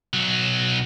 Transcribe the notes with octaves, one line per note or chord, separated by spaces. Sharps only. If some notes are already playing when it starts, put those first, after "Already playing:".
B1 F#3